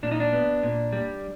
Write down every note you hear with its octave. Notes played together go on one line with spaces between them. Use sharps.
A#2 D4
D#4
D4
B3
A#2
G3